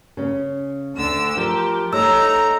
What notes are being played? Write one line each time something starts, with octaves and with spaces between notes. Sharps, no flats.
C#3 C#4
D2 D3 E6
F3 G4 A#4
A3 D#4 C#5 A#5 E6